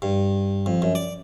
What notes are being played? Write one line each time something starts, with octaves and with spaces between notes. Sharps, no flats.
G2
F2
F#2
D5